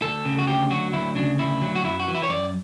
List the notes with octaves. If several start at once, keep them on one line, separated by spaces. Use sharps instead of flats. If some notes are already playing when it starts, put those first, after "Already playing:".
D2 A4
C#3
F#4
D2 G4
F#3 F#4
D2 E4
C#3 D4
D2 E4
F#3
F#4
F#2 E4
F#4
E3
E4
C#5
F#2 D5